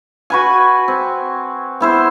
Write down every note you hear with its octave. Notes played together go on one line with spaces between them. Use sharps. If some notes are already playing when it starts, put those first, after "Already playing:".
F#4 B4 G#5
C4
B3 E4 C5